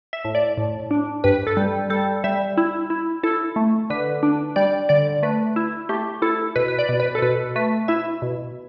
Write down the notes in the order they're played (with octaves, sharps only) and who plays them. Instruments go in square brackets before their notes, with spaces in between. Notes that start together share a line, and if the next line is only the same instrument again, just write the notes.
[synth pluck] E5
A2
D5
A2
D4
G2 B4
A4
G3
G3 A4
G3 E5
E4
E4
E4 A4
A3
D3 B4
D4
G3 D5
D3 D5
A3 B4
E4
A3 G4
E4 A4
B2 B4
B4
D5
B2
B4
A4
B2 B4
A3 B4
E4 E5
B2